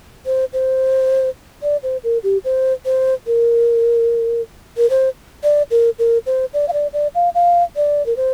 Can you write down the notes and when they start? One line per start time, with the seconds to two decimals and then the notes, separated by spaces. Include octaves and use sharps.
0.26 C5
0.53 C5
1.63 D5
1.83 C5
2.04 A#4
2.23 G4
2.44 C5
2.85 C5
3.27 A#4
4.77 A#4
4.90 C5
5.43 D5
5.71 A#4
5.99 A#4
6.26 C5
6.54 D5
6.68 F5
6.73 D5
6.93 D5
7.15 F5
7.35 F5
7.76 D5
8.06 A#4
8.16 C5